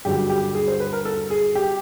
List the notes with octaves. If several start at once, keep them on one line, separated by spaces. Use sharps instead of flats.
G2 D3 F#3 G4
G4
G#4
C5
B4
A#4
A4
G#4
G4